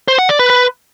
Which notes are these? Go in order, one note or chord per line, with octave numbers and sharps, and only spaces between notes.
C5
F#5
D5
B4
B4